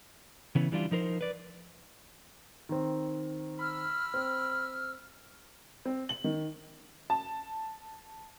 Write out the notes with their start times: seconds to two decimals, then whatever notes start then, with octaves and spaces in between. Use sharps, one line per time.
0.55 C#3 E3 B3 C#4
0.72 E3 G3 D4 F4
0.91 F3 D#4 A#4 C5
1.21 B4 D5
2.69 D#3 C4
3.59 B5 E6 F6
4.14 C4
5.85 C4
6.09 F#7
6.24 D#3
7.10 A5